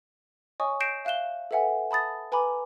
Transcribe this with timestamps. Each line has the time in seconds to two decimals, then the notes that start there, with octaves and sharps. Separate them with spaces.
0.60 C#5 D#5 G#5 C#6 D#6
0.80 G6 A#6 C7 D7 E7
1.05 E5 F5 F#6 E7 G7
1.51 A4 B4 E5 F#5 G#5
1.91 A5 B5 D#6 A6
2.32 B4 G#5 A#5 B5 D6